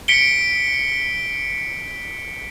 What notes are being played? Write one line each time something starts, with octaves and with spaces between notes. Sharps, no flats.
B6 C#7 D7 G7